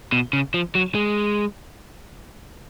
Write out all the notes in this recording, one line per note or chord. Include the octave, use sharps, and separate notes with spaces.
B2
C#3
F3
F#3
G#3